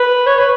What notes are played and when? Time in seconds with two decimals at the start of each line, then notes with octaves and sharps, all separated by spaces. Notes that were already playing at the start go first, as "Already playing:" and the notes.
Already playing: B4
0.26 C#5
0.38 B4